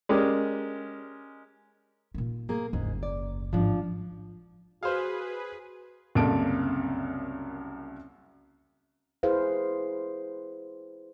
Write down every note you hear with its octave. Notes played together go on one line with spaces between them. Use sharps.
G#3 C#4 G4 A#4 D5
A#2 D#3
A#3 G#4 A#4
F#1 D#2 G#2
D5
A1 G#2 F3 D4
F#4 G#4 B4 C5 F5
C2 F#2 C#3 A#3 A4 D7
E4 G#4 B4 C5 F5